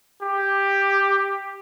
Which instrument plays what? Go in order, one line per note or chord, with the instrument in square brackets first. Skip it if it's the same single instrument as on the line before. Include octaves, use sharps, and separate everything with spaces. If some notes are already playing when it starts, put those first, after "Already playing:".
[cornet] G4